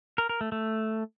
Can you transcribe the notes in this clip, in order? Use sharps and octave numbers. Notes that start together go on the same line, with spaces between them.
A#4
A#4
A3
A3